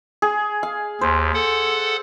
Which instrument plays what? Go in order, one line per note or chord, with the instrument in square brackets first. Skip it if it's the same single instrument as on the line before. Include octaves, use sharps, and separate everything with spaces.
[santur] G#4
F5
[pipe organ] D#2 [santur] C5
[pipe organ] A4 F#5